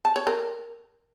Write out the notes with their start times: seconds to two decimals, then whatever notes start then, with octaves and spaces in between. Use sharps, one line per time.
0.05 A5
0.16 C#5
0.27 A#4